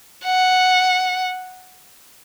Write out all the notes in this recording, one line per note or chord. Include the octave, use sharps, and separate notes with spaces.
F#5